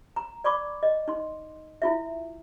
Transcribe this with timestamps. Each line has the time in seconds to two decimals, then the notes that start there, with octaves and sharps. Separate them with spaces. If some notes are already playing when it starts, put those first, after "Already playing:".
0.16 A#5
0.44 D5 B5 C#6 D6
0.83 D#5
1.08 D#4 C6
1.82 E4 F4 E5